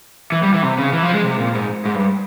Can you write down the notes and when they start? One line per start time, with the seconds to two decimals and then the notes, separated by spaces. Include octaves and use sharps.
0.32 E3
0.43 G3
0.54 E3
0.63 C3
0.78 C#3
0.93 E3
1.03 F3
1.13 G#3
1.24 C3
1.39 A#2
1.55 G#2
1.85 G#2
1.95 G2